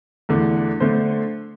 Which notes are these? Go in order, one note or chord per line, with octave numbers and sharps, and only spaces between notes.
E2 D3 A3
D3 A3 C5